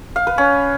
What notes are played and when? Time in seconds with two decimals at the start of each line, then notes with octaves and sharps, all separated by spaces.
0.16 F5
0.27 B4
0.38 C#4